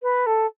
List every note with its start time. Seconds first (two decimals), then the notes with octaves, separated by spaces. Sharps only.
0.02 B4
0.26 A4